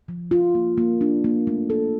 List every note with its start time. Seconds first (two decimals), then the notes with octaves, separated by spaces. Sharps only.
0.08 F3
0.31 F4
0.55 A#3
0.78 A#3
1.01 D4
1.24 A#3
1.47 A3
1.70 A4